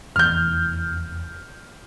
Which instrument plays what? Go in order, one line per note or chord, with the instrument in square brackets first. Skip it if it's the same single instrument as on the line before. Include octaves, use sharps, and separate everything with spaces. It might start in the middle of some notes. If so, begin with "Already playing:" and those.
[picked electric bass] F1 E2 E3 [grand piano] F6 G6